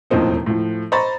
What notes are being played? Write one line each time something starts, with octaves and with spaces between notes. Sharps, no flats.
E1 D#2 A2 F3 C4 D#4
A2 F3
C5 D#5 A#5 B5 C#6 A6